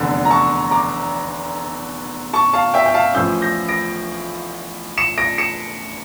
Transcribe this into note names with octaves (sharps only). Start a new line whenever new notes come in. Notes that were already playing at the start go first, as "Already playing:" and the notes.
Already playing: F1 E2 D3
A#5
A5 C#6
A#5 D6
A5 C#6
F5 A5
E5 G5
G5
F5 A5
A1 A2 F3 C#4 E6 G6
G6 A#6
A#6 D7
C#7 E7
A#6 D7
C#7 E7